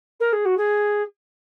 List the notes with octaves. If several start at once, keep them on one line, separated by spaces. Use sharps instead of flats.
A#4
G#4
F#4
G#4